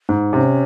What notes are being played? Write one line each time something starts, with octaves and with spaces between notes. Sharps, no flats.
G#2
C3 C#4